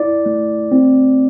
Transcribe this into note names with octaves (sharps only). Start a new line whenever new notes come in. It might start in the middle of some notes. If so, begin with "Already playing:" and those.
Already playing: E4 D5
A3
C4